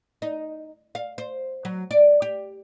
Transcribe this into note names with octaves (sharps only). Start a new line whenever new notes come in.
D#4
F5
C5
F#3
D5
G4